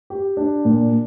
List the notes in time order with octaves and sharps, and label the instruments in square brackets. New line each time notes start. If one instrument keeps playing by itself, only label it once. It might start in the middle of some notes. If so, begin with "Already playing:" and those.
[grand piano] G4
D4
A#2